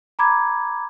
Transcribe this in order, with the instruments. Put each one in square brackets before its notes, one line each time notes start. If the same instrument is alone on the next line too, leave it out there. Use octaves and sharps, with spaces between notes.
[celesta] A#5 B5 D6 G#6